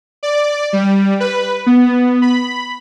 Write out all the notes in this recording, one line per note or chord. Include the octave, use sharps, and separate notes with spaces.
D5
G3
B4
B3
B5